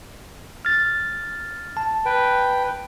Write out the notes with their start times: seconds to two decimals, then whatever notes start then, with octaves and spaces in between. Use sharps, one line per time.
0.65 F6 A6
1.77 A5
2.06 B4 G5